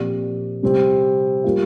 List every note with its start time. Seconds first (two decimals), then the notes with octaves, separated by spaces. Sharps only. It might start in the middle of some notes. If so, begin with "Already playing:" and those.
Already playing: A#2 F3 C4 G4 D5
0.62 C3 G3 C4 G4
1.44 G3 A#3 F4